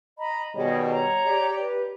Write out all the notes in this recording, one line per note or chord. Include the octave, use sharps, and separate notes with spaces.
D#5 A#5 B5
B2 D#3 G3 G#4 C#5 D#5
C#5 A#5
G4 D5
B4